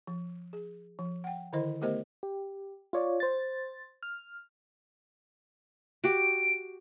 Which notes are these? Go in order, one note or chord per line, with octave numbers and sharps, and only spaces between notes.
F3
G#4
F3
F#5 G5
D3 D#3 E4 C5 D#5
A3 B3 G4 A#4 C5 D#5
G4
F4 C#5 D5
C5 A6
F6
F#4 G4 D7